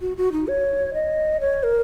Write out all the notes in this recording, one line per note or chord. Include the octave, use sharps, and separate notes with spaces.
F#4
F#4
D#4
C#5
D#5
C#5
A#4